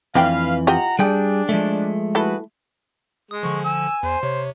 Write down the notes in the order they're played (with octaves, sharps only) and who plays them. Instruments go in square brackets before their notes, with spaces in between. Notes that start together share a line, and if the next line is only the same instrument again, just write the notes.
[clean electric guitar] F2 E3 [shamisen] A3 D4 G5 [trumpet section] B4 F5
[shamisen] F4 G4 D#5 [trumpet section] F#5 A#5
[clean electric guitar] G3 G#4 G5 [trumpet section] D4
[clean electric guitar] F3 G#3 A3
[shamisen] E4 A4 [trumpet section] F#4 G#4 B4
[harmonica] G#3 G#4 [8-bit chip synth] D#6
[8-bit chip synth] D3 F3 [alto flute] C#6
[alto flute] G#5 [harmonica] E6
[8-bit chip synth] E2 [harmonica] C5
[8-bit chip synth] C3 [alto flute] C#5